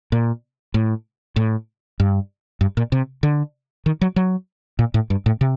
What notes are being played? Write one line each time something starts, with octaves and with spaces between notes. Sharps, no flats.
A#2
A2
A2
G2
G2
A#2
C3
D3
D#3
F#3
F#3
A#2
A2
G2
A2
C3